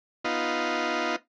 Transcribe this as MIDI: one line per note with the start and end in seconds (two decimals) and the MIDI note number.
0.25 1.16 59
0.25 1.16 63
0.25 1.16 65